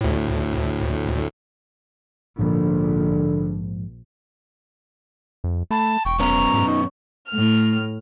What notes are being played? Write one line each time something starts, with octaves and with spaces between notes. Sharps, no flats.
D2 A2
A#1 G#2 D3 F3
F2
A3 A5 B5
E1 G5 C#6
F#2 B3 C#4 A#5
G#2
D#4
A2 F6